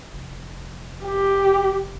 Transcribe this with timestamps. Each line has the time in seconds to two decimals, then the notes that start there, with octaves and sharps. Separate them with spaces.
0.14 F1
1.04 G4